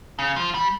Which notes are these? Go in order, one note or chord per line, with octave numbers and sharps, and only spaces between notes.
C#3
F3
G3